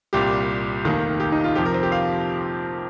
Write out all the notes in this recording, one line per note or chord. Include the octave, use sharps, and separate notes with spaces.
C2 A#2 G3 G4
F1 D#2 D#3
G4
D#4
F4
F2 C3 F3 G4
A#4
C4
G4
F5